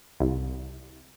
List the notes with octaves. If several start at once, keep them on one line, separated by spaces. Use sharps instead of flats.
C2